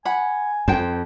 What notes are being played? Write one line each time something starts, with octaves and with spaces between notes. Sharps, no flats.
F#5 G#5 B5
F2 C5 G5